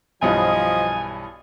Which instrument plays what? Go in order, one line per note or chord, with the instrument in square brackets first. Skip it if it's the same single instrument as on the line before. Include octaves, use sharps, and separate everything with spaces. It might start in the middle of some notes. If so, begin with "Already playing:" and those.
[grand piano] B1 G2 E3 [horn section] F3 D#5 [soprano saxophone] G#5